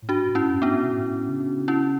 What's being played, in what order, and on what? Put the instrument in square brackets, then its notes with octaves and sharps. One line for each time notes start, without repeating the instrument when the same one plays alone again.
[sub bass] A2
[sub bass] G#2 [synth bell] D4 F#4
[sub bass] A2
[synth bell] C#4 E4
[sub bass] F#2
[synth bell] B3 D4
[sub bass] G#2
B2
A2
C#3
[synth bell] C#4 E4